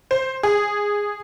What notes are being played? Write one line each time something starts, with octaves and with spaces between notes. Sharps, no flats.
C5
G#4